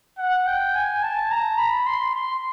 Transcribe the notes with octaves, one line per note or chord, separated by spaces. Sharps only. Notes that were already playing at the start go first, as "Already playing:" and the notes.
F#5
G5
G#5
A5
A#5
B5
C6
C6